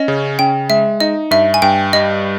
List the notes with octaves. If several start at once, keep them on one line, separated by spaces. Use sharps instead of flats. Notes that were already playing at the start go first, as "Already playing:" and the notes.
Already playing: C#4 D#5
C#3
C#3 G5
G#3 E5
D#4 D#5
G2 E5
G#5
G2 G5
G3 D#5